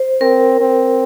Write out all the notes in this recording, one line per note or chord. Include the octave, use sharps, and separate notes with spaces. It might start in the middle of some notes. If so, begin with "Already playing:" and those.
Already playing: C5
C4 A#4
C4